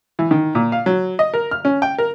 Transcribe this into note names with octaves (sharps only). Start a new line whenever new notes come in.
E3
D#3
A#2
F5
F#3
D#5
A#4
F6
C#4
G5
A#4